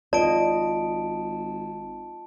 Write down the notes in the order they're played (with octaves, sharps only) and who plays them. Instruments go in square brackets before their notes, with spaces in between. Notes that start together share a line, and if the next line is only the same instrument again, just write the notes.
[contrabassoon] G#1 [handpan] F4 D#5 [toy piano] D5 [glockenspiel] A5 D7